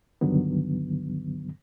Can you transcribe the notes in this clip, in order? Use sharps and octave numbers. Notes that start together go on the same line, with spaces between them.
C#2 G2 D3 D#3 F#3 B3